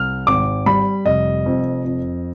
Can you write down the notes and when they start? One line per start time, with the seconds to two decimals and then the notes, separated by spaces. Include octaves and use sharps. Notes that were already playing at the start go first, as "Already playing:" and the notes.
Already playing: C2 F6
0.27 G#1 D6
0.66 G3 B5
1.06 F1 D#5
1.46 F2
1.85 F2